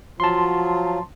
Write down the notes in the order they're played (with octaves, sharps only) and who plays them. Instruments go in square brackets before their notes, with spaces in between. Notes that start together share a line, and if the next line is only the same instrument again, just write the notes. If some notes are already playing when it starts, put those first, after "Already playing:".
[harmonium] F3 F#3 F4 [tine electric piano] A5 C6